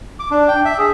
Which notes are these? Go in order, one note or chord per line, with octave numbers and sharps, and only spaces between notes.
D6
D4
G5
E5
G#4